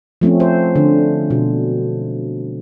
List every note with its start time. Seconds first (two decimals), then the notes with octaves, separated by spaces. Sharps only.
0.21 F3 A3 C4 C#4
0.40 C5
0.76 D3
1.30 B2